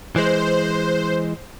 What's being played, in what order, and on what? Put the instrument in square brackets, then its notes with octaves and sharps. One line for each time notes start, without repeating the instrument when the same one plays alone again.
[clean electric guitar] E3 G#3 [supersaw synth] C5